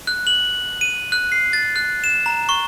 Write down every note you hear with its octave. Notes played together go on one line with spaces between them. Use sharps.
F#6
F#7
D#7
F#6
C7
A6
F#6
E7
A#5
C#6